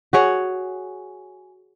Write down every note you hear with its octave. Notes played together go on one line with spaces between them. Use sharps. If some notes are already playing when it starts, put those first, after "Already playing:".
F#4 G#4 C#5 F#5